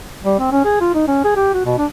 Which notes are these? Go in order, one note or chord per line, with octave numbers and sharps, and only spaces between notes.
G3
C4
C#4
G#4
F4
D#4
C#4
G#4
G4
F#4
B2
D4